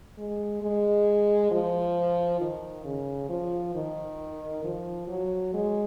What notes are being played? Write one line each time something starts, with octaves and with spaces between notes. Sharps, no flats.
G#3
G#3
F3
D#3
C#3
F3
D#3
F3
F#3
G#3